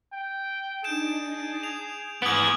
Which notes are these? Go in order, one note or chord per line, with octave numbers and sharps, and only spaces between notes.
G5
D4 D#4 G#4 A5 G6 D7 E7
G#6 F7
G#2 A3 B3 G#4 D7 F#7